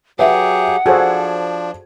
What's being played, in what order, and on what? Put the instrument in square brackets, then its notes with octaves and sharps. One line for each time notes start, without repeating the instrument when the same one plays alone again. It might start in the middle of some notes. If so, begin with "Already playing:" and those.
[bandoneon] F#3 G4 G#4 [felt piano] B4 E5 [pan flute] F#5
[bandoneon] F3 D4 [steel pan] F#4 G#4 A4 [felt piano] C5 G#6